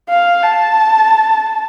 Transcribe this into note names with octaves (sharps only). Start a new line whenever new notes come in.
F5
A5